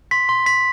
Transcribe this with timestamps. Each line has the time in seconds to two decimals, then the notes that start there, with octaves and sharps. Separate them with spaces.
0.11 C6 B6
0.29 C6
0.46 C6 B6